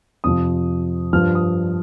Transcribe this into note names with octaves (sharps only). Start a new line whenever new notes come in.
F2 C3 F3 D#6
G2 F3 F6
D#6